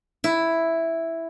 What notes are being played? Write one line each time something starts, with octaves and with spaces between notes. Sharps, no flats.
E4